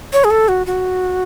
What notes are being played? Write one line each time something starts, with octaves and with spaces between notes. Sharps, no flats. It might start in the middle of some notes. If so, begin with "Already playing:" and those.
C#5
G#4
A4
F#4
F#4